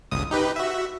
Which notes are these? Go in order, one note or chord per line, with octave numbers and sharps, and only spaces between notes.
G1 C#2 D#6
D#4 G4 B4
F#4 E5